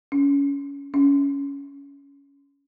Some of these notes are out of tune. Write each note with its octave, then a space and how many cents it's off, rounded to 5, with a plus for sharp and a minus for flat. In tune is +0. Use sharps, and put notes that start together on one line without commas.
C#4 +20
C#4 +15